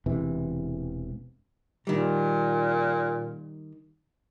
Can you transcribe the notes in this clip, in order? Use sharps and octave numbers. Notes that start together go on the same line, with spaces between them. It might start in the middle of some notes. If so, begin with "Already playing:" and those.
E1 C3 E3
A#2 D#3 G3